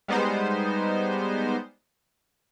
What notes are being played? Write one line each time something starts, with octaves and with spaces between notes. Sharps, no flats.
G3 G#3 B3 D#4 C5